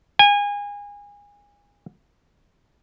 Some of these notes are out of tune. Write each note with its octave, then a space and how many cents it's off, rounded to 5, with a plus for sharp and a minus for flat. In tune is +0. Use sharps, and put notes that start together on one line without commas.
G#5 -30